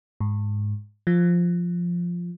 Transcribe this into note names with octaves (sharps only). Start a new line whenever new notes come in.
G#2
F3